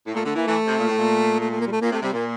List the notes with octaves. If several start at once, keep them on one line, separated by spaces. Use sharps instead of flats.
A2
A#2 A3
D3 A3
E3 A#3
E3 A3
C3
A#2
A2
A#2
A3
A3
A#3
G3
A3
A#2 A#3
C3 A3
C3 G3
A#2 A#3